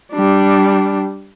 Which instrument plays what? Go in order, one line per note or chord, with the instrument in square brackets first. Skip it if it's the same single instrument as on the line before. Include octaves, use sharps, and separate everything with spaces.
[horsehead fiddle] G3 D4